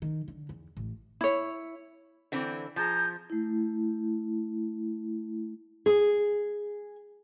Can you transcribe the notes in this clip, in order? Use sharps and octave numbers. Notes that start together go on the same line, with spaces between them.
D#3
D3
E2
A1
E4 C#5
D3 E3 C4
F3 G#4 A#5 G6
A3 E4
G#4